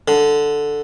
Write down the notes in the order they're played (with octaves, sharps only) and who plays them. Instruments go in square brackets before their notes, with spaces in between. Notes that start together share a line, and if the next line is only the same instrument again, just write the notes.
[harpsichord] D3